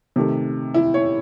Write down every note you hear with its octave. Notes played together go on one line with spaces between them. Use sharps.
C3 D#3 A3
E4
C#5